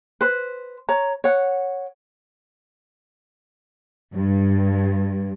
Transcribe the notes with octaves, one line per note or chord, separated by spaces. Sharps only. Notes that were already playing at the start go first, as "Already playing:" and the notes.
B4 C5
C#5 A#5
C#5 F#5
G2